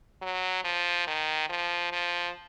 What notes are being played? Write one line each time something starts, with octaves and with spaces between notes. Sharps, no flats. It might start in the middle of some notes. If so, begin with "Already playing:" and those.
F#3
F3
D#3
F3
F3